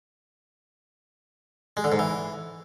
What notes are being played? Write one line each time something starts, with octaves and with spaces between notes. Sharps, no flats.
G#3
D3
G#2
E3